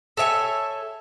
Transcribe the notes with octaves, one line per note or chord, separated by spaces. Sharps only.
A4 C#5 E5 G#5